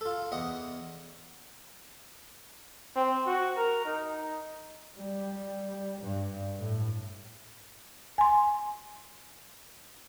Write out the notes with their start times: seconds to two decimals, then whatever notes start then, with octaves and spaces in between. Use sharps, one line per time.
0.01 F4 A4
0.32 E2 D#5 F#5
2.96 C4
3.26 F#4
3.57 A#4
3.85 D#4
4.95 G3
5.99 G2
6.60 A2
8.18 G#5 C6